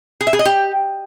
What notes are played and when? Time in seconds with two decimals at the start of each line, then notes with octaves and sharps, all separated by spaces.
0.21 G#4
0.27 E5
0.33 G#4
0.39 D#5
0.45 G4